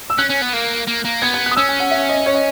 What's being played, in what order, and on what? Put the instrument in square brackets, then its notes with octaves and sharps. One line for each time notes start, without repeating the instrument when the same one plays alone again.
[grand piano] E6
[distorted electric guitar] C#4 [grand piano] F#6
[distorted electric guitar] C#4
B3
A#3
A#3
A#3
[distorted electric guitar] B3 [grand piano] G#6
[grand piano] G#6
F#6
D#6
[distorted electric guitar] C#4 [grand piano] E6
[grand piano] G#5
F#5
E5
D#5
C#5
D#5